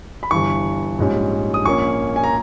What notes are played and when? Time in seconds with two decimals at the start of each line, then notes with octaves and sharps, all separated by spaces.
0.23 B5
0.31 G1 G2 E3 C#6
0.98 A#1 G#2 G3 C#4
1.54 D#6
1.65 A#1 A#2 A#3 C#4 C#6
2.16 G#5
2.24 A#5